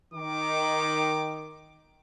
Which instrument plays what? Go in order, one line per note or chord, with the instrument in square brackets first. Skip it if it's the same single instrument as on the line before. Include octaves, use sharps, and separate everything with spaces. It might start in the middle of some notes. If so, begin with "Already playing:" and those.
[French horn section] D#3 [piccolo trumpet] D6